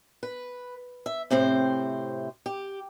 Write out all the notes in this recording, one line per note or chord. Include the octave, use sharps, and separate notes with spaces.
B4
E5
A2 C3 C4 C5
G4